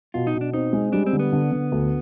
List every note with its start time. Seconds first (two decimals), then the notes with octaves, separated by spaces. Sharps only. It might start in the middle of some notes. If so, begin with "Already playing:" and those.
0.14 B2 F4
0.27 D#4
0.35 B2
0.41 D4
0.53 C4 D#4
0.73 G#3
0.93 G3 D4
1.06 C4
1.13 D3
1.19 B3
1.33 D3
1.52 D3
1.72 D2